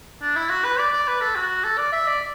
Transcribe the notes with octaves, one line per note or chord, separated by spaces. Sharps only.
D4
E4
F#4
B4
D5
D5
B4
A4
F#4
A4
D5
E5
D5